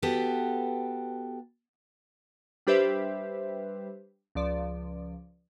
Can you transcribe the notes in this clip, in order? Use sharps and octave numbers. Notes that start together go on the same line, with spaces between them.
B3 F#4 G4 A4
G3 D4 G4 B4 C5 E5
C#2 F3 D5